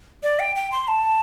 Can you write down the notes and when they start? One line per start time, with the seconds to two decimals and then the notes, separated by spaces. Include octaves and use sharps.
0.23 D5
0.39 G5
0.56 G5
0.72 C6
0.88 A5